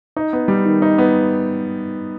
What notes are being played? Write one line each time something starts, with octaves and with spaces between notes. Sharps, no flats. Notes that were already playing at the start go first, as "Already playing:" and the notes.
D#4
B3
G3
D#3
D#4
B3